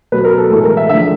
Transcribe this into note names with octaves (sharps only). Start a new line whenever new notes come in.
B2 F#3 B4
A#4
A4
A2 E3 G#3 A4
A#4
E5
D3 F3 G#3 E5